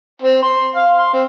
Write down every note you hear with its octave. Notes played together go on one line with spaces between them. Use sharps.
C4
C6
F5
C6
C4